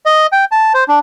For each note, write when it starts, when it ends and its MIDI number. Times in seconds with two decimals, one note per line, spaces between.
0.06 0.27 75
0.32 0.45 79
0.52 0.73 81
0.74 0.84 72
0.88 0.99 62